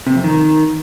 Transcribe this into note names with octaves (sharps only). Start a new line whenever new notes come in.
C3
F2
D#3